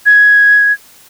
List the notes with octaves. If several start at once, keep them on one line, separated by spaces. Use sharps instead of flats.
G#6